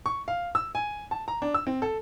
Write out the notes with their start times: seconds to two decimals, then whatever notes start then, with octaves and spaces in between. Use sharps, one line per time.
0.06 C#6
0.28 F5
0.55 E6
0.75 G#5
1.11 A5
1.28 A#5
1.42 D4
1.54 E6
1.67 C4
1.82 A4